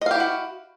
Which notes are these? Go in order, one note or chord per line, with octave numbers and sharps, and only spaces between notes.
E4 F#4 G4 D#5 F5